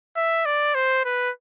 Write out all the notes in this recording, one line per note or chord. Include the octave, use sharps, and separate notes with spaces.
E5
D5
C5
B4